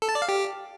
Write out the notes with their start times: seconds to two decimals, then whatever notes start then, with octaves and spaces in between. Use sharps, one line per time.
0.02 A4
0.09 A5
0.15 D5
0.22 F5
0.29 G4